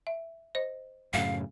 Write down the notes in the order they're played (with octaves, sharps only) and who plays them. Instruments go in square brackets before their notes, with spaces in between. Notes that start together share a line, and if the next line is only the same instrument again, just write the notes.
[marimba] E5
C5 D#5
[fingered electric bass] F#2 A2 C#3 [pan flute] F5